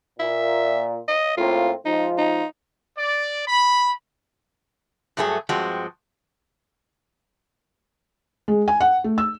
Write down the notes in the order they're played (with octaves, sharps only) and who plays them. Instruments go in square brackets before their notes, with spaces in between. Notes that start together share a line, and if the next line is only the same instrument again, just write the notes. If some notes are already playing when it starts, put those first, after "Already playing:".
[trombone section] A#2 [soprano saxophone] E5
[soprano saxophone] D#5
[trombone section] A2 A#3 C4 [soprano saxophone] F4
[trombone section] F3 G#3 F4 [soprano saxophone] D#4
[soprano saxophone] D#4
[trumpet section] D5
B5
[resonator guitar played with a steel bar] G2 F#3 A3 D4 G#4
G2 F3 G#3 C4 F#4
[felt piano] G#3
G#5
F#5
A3
E6